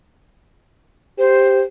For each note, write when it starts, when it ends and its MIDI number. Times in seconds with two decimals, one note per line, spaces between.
1.19 1.64 67
1.19 1.62 72